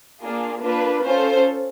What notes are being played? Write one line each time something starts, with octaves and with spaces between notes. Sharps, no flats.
A#3 D4 F4 G#4
A#3 D4 F4 B4
C#4 F4 A4 C5